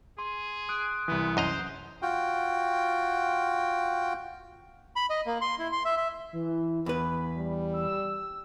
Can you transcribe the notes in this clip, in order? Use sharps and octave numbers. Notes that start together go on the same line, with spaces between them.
G#4 C6
D#6 F#6 D7
C2 E3 B3 D#6
F#2 C5 D#5 A#5
F4 F#4 G5
B5
D#5
A#3
C6
E4
C6
E5
E5
E3
E2 B4 B5
G3
E6